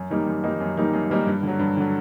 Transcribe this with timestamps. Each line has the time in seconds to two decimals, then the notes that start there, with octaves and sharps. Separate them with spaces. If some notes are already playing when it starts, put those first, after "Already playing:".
Already playing: F#2
0.10 D#3 G3 A#3 D#4
0.27 F#2
0.43 D#3 G3 A#3 D#4
0.60 F#2
0.77 D#3 G3 A#3 D#4
0.93 F#2
1.10 D#3 G3 A#3 D#4
1.27 G2
1.43 D3 F#3
1.59 G2
1.77 D3 F#3